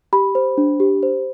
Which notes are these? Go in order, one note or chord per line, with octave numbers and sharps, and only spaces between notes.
G4 B5
C5
D4
G4
C5